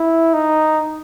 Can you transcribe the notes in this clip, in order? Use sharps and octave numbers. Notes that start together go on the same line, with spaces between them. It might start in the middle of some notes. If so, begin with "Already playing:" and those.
Already playing: E4
D#4